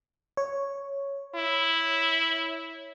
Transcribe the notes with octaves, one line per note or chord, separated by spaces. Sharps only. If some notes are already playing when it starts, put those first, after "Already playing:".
C#5
E4